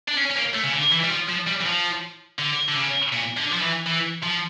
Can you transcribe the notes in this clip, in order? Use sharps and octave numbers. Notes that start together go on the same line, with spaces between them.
D4
C#4
C#4
A#3
A3
C#3
D3
E3
G3
F3
F3
G3
E3
F3
D3
D3
C#3
A#2
D3
F3
E3
E3
F3